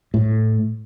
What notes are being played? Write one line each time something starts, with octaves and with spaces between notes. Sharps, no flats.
A2